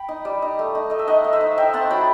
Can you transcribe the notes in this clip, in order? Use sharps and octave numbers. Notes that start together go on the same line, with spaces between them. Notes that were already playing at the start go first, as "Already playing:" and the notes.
Already playing: G5 B5
D#4
G3
D#4
A3
D#4
A3 D#5
E5
D#4 D#5 F#5
A3
C5 E5
D#4
D#4 E5 G5
C4 F#5 A5
F#3 G5 B5